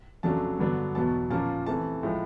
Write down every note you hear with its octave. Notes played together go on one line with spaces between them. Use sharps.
F2 C#3 F#3 A3 D4 A5
G2 D3 F#3 B3 D4
E2 B2 F#3 A5
A#2 F3 A#3 C#4 A5
C3 E3 A3 A5
A2 F3 G#3